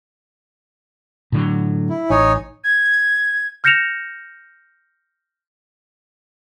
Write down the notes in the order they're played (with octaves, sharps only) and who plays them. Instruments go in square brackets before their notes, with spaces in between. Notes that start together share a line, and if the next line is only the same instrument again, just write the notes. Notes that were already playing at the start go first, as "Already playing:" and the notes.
[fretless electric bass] A2 D3 F#3
[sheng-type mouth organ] E4
[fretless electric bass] A1 [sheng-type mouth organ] D#4 C#5 G#5
[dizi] G#6
[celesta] F6 G6 A#6 C#7 E7 F7